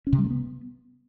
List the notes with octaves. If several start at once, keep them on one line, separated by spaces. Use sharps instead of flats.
C#4
C3
G3
A3
B3